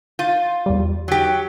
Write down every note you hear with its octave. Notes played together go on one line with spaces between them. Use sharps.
F4 G6 D#7
E2 G3
F#3 G4